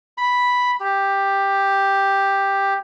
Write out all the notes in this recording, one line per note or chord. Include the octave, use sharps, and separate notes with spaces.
B5
G4